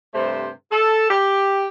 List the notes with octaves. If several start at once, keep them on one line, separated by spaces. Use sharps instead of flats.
G2 C3 A3 C5
A4
G4